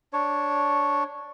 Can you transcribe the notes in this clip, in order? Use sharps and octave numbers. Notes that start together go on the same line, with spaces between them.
D4 C#5